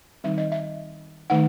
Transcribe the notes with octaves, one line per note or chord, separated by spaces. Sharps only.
D#3 G3 C4 D#4 E5
D#5
E5
D#3 A3 D#4 F#5